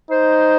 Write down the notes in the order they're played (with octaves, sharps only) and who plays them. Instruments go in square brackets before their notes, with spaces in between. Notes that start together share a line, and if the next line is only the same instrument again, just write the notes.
[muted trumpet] D#4 [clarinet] C5